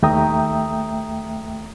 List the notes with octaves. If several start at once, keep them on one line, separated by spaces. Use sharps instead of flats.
D#2 A3 E5 G5 A#5 D#6